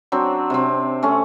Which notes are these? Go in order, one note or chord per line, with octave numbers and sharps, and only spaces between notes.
F#3 C4 D4
C3 C4
A3 C#4